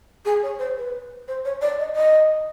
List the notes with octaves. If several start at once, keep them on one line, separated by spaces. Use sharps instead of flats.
G#4
C#5
C5
B4
C5
C#5
D5
D#5
D#5